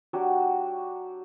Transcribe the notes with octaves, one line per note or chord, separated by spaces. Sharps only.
F#3 D4 F#4 G4